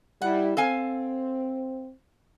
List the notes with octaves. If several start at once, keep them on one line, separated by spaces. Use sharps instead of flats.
G3 E4 F#5
C4 A4 F5 G#5